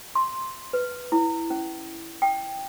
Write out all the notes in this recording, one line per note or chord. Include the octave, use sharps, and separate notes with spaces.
C6
B4
E4
C#4
G5